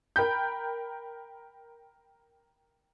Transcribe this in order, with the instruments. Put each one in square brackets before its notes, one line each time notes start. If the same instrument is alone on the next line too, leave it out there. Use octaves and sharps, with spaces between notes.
[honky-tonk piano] A#4 G5 B5 G6